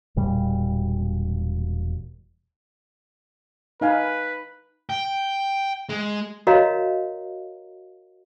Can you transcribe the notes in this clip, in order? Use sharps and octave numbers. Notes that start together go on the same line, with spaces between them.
E1 A#2 G3
D#4 B4 F5 G#5
G5
G#3
F#4 A#4 C#5 D#5 F5 A#5